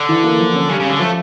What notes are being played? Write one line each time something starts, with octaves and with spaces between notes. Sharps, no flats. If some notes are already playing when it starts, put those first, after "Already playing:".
Already playing: D3
E3
A#3
F3
C#4
C#3 G3
C#3
D3 C#4
F3 A3